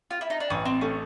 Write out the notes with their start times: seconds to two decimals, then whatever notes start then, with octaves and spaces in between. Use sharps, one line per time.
0.11 F4
0.21 E4
0.30 D#4
0.40 D4
0.50 A1 C#4
0.65 C4
0.81 A3 C#4